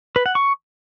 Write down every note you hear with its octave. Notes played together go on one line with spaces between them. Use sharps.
B4
F#5
C#6